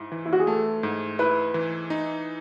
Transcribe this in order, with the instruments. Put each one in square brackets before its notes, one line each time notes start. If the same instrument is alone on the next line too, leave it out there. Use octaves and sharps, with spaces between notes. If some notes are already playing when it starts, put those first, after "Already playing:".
Already playing: [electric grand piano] G#2 E4
E3
[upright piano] E4
F#4
G#4
[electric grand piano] A3 [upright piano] A4
[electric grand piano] G#2
[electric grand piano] E4 [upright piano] B4
[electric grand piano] E3
D#4